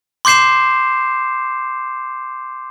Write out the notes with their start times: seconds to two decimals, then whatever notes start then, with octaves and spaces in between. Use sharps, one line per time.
0.25 C6 D6 G6 C7 E7